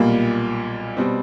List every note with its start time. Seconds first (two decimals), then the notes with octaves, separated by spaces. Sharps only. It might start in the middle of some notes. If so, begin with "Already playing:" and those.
Already playing: B1 A#2 G3 A#3
0.97 B2 G3 C4